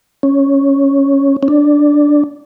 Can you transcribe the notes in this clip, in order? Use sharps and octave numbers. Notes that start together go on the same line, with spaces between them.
C#4
C#4
D4